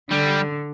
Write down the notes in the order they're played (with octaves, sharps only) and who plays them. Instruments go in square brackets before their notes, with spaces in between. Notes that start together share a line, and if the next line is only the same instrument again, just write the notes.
[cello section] D3 [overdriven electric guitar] G3